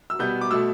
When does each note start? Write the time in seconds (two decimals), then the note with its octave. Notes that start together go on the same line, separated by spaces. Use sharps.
0.10 E6
0.19 B2 G3 B3 G6
0.41 D6
0.51 B2 A3 E6